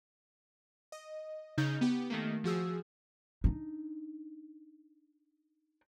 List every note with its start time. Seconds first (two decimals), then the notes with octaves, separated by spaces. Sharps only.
0.92 D#5
1.58 C#3 D#4 G6
1.81 B3 G4
2.10 D#3 A3 A#3
2.44 F3 F#4 G#4 E6
3.44 D4 D#4